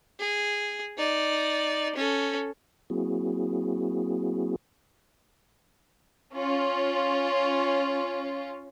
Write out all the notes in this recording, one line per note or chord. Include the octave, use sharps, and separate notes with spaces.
G#4
D#4 D5
C#4 A4
F#3 A#3 C4 E4 F#4 G#4
C#4 F4